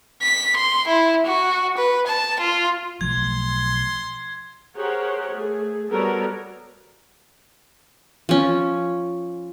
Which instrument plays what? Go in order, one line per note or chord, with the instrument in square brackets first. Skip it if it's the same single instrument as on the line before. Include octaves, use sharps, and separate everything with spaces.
[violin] B6
C6
E4
F#4
B4
A5
F4
[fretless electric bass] B1 F3 A3 [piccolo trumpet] C6 [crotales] G#6
[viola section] G4 G#4 A#4 C5 C#5 F#5
A3 G#4
G3 B3 F#4 A4 A#4 C#5
[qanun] F3 C#4